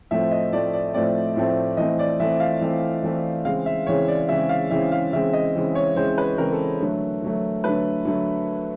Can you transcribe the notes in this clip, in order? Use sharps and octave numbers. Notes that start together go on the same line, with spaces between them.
A2 F3 A3 C4 E5
D#5
A2 F3 A3 C4 D5
D5
A2 F3 A3 C4 D5
A2 F3 A3 C4
E3 A3 C4 D#5
D5
E3 A3 C4 E5
F5
E3 A3 C4
E3 A3 C4
C#3 E3 G#3 C4 F5
E5
C#3 E3 G#3 C4 C#5
D5
C#3 E3 G#3 C4 E5
F5
C#3 E3 G#3 C4 E5
F5
C#3 E3 G#3 C4 E5
D#5
C#3 E3 G#3 C4
C#5
C#3 E3 G#3 C4 C5
B4
C#3 E3 G#3 C4 A#4
A4
D3 F#3 A3
D3 F#3 A3
D3 F#3 A3 B4
D3 F#3 A3